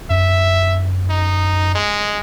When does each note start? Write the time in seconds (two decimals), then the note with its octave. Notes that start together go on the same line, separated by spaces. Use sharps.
0.10 F#2 E5
1.10 D#4
1.75 G#3